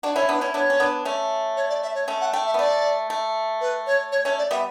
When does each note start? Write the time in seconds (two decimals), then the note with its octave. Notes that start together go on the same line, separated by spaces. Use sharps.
0.03 D4 F#4 D5
0.16 C#4 E4 C#5
0.29 B3 D4 B4
0.41 C#4 E4 C#5
0.54 B3 D4 C#5
0.70 C#4
0.80 B3 D4
1.05 A3 C#4
1.57 C#5
1.70 D5
1.82 E5
1.95 C#5
2.08 A3 C#4
2.21 F#5
2.33 A3 G5
2.46 E5
2.54 B3
2.58 A3 D5
3.10 A3
3.61 B4
3.87 C#5
4.12 C#5
4.25 A3 C#4 C#5
4.38 D5
4.51 G3 B3 E5